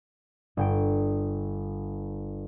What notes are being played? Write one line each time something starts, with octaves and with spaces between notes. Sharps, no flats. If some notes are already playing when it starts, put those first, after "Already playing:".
G1 G5 D7